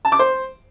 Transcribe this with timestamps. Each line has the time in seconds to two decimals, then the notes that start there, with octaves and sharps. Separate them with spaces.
0.05 A5
0.12 D6
0.19 C5